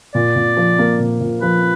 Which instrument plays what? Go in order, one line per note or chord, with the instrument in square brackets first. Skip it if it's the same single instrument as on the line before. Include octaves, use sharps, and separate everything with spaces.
[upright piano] A#2 [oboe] D5
[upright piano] A#2
F3
A#3
A#2
A#2
[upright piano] F3 [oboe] B4